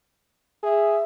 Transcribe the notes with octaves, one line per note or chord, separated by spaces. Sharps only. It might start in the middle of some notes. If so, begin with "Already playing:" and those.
G#4 E5